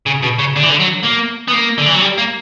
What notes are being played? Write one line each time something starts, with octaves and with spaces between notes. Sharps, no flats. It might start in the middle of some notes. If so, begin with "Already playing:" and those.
C#3
B2
C#3
D3
E3
D3
F#3
A#3
B3
A#3
D3
E3
F#3
G3
A#3